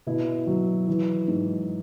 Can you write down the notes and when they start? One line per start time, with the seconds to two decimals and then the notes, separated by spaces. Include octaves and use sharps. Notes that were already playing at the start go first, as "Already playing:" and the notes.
0.07 B2 E4
0.47 F#3
0.88 E3
1.28 G#2